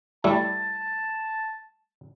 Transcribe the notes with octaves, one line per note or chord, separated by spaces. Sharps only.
G3 A3 E4 A5